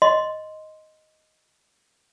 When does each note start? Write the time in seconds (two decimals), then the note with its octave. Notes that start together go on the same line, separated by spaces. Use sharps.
0.02 D#5 C6